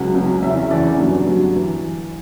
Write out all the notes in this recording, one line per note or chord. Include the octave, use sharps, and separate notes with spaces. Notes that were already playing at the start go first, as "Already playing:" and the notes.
Already playing: C#2 C#3 F#3 F#5
C#2 C#3 F#3
E2 C#3 E3 E5
E5
E2 C#3 E3 D5
G2 D3 F#3
G2 D3 F#3
E3